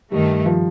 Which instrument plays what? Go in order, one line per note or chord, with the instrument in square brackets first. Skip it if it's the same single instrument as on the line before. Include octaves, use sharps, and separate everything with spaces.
[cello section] G2 D#3 A3 [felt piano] G3
[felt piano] F3